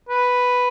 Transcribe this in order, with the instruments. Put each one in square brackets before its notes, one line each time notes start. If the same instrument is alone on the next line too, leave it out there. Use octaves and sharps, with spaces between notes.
[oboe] B4